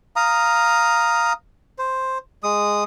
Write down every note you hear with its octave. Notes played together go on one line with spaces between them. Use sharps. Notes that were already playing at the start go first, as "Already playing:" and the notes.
F5 A#5 D#6
C5
G#3 D#6